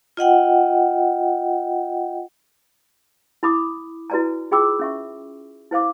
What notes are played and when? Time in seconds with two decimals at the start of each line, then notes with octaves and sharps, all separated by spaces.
0.17 F4 D#5 F#5 G5
3.43 E4 B5 D6 D#6
4.10 E4 F#4 B4 D5 G#5 A#5
4.51 F4 G#4 G5 B5 D6 E6
4.79 C#4 E5 C#6
5.71 E4 C5 F5 D6